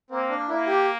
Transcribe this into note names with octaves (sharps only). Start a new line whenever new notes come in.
A#3 C4
D4
A#3 E4
G4